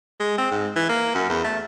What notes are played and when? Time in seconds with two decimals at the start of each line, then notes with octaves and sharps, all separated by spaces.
0.20 G#3
0.38 C4
0.51 G#2
0.76 E3
0.89 A#3
1.15 F#2
1.29 E2
1.44 A3